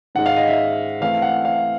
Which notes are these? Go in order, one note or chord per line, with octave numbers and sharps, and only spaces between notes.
G#2 D#3 G#3 F#5
F5
D#5
E5
E3 A3 C4 E4 F5
F#5
F5